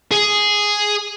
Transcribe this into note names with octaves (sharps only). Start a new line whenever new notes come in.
G#4